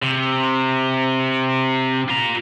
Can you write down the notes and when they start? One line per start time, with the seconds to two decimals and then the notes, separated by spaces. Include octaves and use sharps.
0.03 C3
2.09 F4 A#5